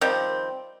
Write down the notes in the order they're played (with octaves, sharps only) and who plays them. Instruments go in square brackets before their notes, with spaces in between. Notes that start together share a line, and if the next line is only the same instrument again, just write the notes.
[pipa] D#3 F3 G3 C4